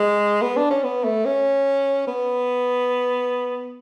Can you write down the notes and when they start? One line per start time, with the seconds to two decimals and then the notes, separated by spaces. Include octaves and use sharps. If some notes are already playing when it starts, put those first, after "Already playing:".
Already playing: G#3
0.42 B3
0.56 D4
0.70 C#4
0.84 B3
1.04 A3
1.25 C#4
2.07 B3